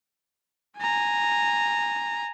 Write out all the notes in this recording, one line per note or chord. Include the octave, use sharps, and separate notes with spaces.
G#5 A#5